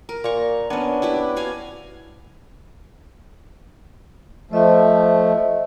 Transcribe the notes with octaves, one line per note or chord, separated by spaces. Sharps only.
A#4
A#2 A#5 C#6
B3 C#4 D4
E4 G4 B4
F#4 F5 G#5
F3 A3 C5 D#5 E5